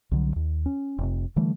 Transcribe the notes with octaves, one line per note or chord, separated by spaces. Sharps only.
C2 D3 F#3
D#2
C#4
F1 C3
D3 E3 G3 A3